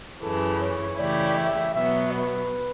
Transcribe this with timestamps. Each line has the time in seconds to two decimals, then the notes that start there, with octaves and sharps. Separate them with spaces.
0.22 F#2 C#3 E3 A4
0.60 C#5
0.98 C#3 E3 A3 E4 G4 D5
1.36 E5
1.74 B2 F#3 B3 E5
2.12 B4